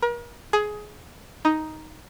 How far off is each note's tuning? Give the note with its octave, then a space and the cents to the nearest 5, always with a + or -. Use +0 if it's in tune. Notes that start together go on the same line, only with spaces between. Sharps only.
A#4 +40
G#4 +15
D#4 +5